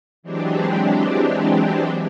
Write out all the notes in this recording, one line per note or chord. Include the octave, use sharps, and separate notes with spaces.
E3 F#3 G#3 C4 D4 G4